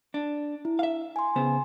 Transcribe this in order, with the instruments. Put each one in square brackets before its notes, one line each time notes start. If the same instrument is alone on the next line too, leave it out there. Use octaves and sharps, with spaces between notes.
[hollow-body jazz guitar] D4
[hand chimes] E4
[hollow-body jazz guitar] E5 F5
[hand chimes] G#5 C6
[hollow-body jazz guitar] C#3 B3 C5